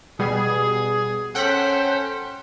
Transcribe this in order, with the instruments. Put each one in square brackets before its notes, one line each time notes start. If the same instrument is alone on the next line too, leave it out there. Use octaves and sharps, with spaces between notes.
[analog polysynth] B2 G3 B3 [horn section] G#4
[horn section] C#4 A4 C5 [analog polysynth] F#5 G5 B6